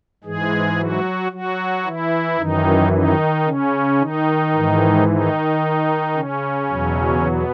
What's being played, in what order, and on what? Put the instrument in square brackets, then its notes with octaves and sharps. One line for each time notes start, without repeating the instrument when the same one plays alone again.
[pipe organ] G#2 E3 G#3 G#4
F#3 F#4
F#3 F#4
E3 E4
F#2 D#3 E3 D#4
D#3 D#4
C#3 C#4
D#3 D#4
G#2 E3
D#3 D#4
C#3 C#4
E2 B2 F#3
B2 B3